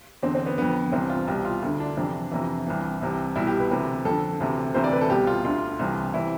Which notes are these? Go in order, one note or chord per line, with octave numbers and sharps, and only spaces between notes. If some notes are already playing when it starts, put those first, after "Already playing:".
E2 D3 C4
C4
B3
F2 D3 B3
C2 C3 E3 C4
F4
C2 B2 G4
F4
D2 D3
D4
F2 C3 E3 D4
F2 C3 E3
C2 C3 E3
C2 C3 E3
C2 B2 E4
G4
B4
D2 C3 E3
F2 A4
D3
D2 C3 E3
D2 C3 E3 C5
D5
B4
A4
C2 B2 G4
F4
D2 D3 F4
C2 C3 E3
C3 E3 E4